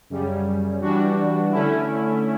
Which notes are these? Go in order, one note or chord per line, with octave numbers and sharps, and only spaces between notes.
F#2 C#3 G3 C#4
E3 G3 D4 F#4
D3 A3 C#4 E4